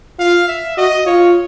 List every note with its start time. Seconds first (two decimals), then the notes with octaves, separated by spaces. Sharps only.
0.19 F4 F5
0.48 E5
0.77 F#4 D#5
1.06 F4 C#5